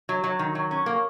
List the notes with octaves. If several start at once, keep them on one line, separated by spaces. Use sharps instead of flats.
F#3
F#3
D#3
F#3
C#4
A#3